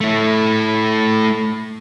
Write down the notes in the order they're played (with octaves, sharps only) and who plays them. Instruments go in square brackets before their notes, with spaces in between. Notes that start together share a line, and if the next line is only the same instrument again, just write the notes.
[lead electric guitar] A3 E4